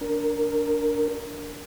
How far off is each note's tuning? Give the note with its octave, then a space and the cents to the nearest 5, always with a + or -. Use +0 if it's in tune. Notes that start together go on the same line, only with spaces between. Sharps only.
D4 -15 A#4 +0